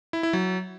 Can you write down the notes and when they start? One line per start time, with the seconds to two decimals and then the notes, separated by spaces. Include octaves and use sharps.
0.13 E4
0.23 E4
0.33 F#3